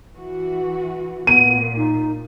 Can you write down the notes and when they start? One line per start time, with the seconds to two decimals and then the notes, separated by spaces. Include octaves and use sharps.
0.15 E3 F#4
1.27 A#2 B3 D#7
1.77 D#4